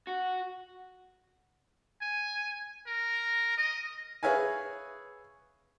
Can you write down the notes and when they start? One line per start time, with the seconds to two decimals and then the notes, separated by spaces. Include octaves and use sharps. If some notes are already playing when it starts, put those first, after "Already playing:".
0.07 F#4
2.01 G#5
2.87 A#4
3.58 D#5
4.23 G#4 B4 C#5 E5 F5 G#5